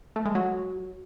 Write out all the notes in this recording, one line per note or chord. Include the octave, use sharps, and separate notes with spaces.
A3
G#3
F#3